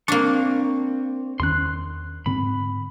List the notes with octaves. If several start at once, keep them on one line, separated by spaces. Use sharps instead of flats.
A#3 C4 D4 C#6
E2 D#3 C#4 C6 F#6
G#2 D3 C4 B5